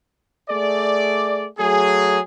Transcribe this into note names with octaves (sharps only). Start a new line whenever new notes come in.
A3 G#4 D5
F#3 A3 G#4